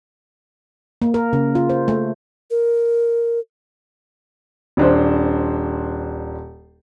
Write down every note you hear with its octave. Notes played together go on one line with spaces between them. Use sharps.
A#3
A#4
C#3
F4
C5
A3
A#4
D#1 D4 C5